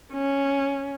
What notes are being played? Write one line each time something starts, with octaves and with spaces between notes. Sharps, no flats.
C#4